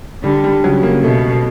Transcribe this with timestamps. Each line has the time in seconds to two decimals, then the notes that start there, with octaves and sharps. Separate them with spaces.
0.23 D3 G3
0.44 G3
0.63 C#3 F#3
0.83 A#3
1.04 B2 A3